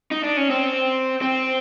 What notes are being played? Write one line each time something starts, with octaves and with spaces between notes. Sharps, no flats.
D#4
D4
C#4
C4
C4